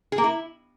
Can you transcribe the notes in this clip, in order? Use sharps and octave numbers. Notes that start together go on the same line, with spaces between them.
G#4
A#3
E4